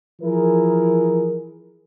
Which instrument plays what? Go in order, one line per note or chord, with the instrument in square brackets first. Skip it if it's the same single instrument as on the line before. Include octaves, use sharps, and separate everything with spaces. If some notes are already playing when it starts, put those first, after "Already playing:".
[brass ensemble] E3 F3 E4 G#4 A#4